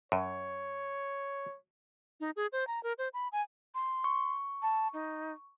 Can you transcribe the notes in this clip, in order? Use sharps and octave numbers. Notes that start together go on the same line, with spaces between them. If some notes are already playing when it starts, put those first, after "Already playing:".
F#2 C#5
D#4
G#4
C5
A#5
A#4
C5
B5
G#5
C6
C#6
A5
D#4